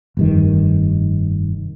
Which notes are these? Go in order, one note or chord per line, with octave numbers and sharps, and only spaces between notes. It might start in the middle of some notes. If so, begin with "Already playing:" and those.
F1 G2 D#3